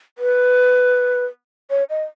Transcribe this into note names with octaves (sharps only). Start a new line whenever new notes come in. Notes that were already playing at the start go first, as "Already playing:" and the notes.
B4
C#5
D#5